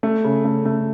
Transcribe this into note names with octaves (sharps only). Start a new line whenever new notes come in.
A3
C#3
A3
A3